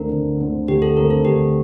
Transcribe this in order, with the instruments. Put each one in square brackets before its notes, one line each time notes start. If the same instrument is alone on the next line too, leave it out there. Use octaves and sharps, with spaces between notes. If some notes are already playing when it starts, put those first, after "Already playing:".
Already playing: [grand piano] D2 D3 A3 C4 [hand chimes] A#4
[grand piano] D2
D3 A3 C4
[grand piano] D2 [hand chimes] G4
[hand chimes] A4
[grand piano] D3 A3 C4 [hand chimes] A#4
[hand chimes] A4
[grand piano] D2 [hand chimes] G4